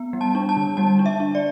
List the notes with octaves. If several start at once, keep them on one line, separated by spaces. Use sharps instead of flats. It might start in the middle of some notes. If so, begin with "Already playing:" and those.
Already playing: B3
G3
A5
D4
A5
D3
G3 A5
D4
E5
D4
D5